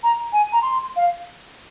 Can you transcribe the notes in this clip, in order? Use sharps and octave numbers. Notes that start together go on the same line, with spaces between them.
A#5
G#5
A#5
C6
F5